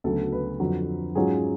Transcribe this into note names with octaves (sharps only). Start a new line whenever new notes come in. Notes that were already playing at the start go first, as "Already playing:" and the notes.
D2 C#3 F#3 B3 A4
B4
F2 D3 F#3
G#2 F#3 C#4 F4 G#4